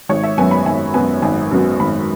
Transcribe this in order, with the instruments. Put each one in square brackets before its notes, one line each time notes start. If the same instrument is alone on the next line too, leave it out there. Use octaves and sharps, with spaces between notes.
[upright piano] G#1 C#5
E5
F#2 F#3 B3 G#5
B5
G#1 G#5
F#2 F#3 B3 G#5
G#1 G#5
F#2 F#3 B3
G#1 B5